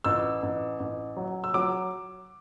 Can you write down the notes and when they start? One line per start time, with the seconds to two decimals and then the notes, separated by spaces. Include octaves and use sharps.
0.04 A1 E6
0.43 A1
0.80 A1
1.17 F#3
1.44 E6
1.54 F#3 D6